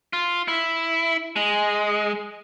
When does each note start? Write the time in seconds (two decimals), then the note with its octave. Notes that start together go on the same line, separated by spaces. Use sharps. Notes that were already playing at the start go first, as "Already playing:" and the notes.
0.13 F4
0.48 E4
1.36 G#3